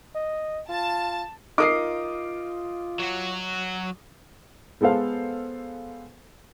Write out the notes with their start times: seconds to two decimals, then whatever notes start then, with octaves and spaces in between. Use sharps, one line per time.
0.15 D#5
0.69 F4 A5
1.58 D#4 F4 A#4 D6 D#6 C7
2.99 F#3 F#4
4.81 G#3 B3 A4 C5 F5